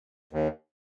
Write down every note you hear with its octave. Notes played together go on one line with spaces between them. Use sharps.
D#2